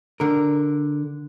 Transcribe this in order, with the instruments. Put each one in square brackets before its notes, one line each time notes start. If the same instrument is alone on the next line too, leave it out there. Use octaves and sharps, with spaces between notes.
[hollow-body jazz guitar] D3 A#4